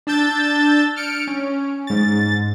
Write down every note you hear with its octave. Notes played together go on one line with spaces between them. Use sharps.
D4 A5 E6 G6 A6
F6 C#7 D7
C#4
G#2 A6